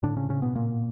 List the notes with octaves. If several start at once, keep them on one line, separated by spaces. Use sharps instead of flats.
A2 D3 D4
C#3 C#4
C#3 C#4
B2 B3
A#2 A#3